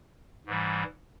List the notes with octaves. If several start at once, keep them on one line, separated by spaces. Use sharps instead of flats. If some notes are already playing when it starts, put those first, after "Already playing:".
G#2 E3 G3